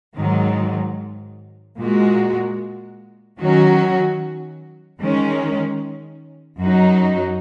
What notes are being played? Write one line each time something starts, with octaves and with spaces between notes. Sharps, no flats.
G#2 D#3 F#3
A#2 G#3 F#4
D#3 F#3 C#4 F#4
D#3 G#3 C#4
F#2 F#3 D#4 F#4